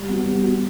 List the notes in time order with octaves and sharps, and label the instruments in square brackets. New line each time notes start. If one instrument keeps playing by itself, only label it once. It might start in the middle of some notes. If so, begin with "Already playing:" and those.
Already playing: [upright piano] G3
B3 F#4
G3
B3 F#4